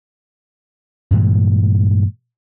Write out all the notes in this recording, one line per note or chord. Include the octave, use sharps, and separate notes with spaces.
G2 A#2 E3 G#3